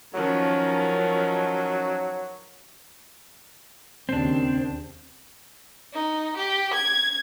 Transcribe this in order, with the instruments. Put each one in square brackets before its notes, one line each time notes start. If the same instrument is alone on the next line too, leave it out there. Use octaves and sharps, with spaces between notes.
[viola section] D#3 F3 C#4 [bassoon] F#3
[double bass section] D#2 C#3 [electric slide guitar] C4 D4
[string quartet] D#4
G4
G#6